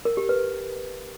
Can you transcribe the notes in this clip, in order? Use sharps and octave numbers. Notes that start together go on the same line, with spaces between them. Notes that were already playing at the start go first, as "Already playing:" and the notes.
A#4
G4
B4